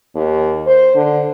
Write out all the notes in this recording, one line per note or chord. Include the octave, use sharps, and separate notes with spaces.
D#2
C5
D3